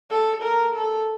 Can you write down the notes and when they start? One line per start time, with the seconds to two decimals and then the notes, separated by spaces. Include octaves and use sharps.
0.11 A4
0.43 A#4
0.75 A4